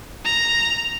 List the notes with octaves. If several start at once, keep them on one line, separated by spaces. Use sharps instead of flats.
A#5